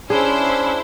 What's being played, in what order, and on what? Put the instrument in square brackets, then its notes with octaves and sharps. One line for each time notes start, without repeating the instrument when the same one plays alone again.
[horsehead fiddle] C#4 [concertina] D4 [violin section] E4 C5 E6 [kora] G#4